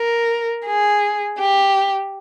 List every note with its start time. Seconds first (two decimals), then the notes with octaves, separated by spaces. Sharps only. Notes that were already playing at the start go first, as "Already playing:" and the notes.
Already playing: A#4
0.67 G#4
1.39 G4